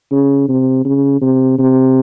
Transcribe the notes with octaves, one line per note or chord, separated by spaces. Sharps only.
C#3
C3
C#3
C3
C3